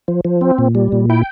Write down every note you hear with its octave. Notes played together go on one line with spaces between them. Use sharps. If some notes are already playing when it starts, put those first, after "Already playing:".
F3
F3
C4
A#2
G3
A#2
E4 G5